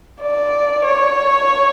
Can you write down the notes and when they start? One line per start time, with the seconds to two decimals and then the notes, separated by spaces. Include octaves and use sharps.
0.21 D5
0.85 C#5